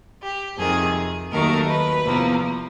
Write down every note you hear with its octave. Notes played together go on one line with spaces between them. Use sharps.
G4
F2 C3 D#3 G#4
D#2 D#3 F#3 A3 A#4
B4
E2 C3 F3 A#3